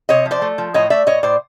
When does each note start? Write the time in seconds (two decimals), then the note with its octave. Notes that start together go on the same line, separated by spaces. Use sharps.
0.09 C3 C#5 D#5
0.26 F3
0.31 C5 D5
0.42 A3
0.58 F3
0.74 A2 C#5 D#5
0.90 A3 D5 E5
1.06 A2 C#5 D#5
1.23 A2 C5 D5